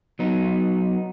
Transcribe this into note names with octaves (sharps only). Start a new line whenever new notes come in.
F#3 B3 D#4